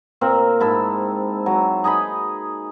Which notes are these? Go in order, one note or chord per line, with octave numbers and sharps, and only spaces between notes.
A#2 C4 A#4
G#2 E4 A4
F#3
D#4 G#4 D#5 B5